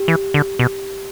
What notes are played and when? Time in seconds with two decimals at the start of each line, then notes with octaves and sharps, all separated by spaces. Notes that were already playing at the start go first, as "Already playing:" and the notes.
Already playing: G4
0.08 E3
0.34 D3
0.59 B2